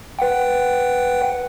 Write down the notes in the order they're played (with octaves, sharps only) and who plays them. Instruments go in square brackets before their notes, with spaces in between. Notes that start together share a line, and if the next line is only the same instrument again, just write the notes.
[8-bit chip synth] B4 F#5 G5